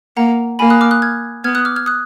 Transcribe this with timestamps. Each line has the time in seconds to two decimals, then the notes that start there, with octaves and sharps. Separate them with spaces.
0.17 A#3 F#5 A#5
0.59 A#3 G#5 B5
0.70 D#6 F#6
0.81 D6 F6
0.91 D#6 F#6
1.02 F6 G#6
1.44 B3 F6 G#6
1.55 D#6 F#6
1.65 D6 F6
1.76 F6 G#6
1.86 D#6 F#6